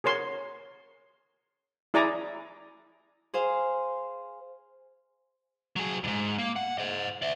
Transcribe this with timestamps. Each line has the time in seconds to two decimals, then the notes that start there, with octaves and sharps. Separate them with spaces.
0.04 G#4 A#4 C#5 C6
1.94 E4 G#4 D5 G#5 A#5 D6
3.34 G#4 C5 F5
5.76 F#3 G#4
6.04 F2 G#2
6.38 A#3
6.56 F#5
6.78 C5 D#5
7.22 D5 E5